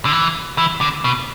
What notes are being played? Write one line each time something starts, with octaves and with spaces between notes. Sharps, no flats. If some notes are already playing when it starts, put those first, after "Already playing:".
D3
E3
E3
D3
B2